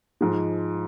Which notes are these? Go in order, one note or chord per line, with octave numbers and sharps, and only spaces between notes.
G#2 F3 G#3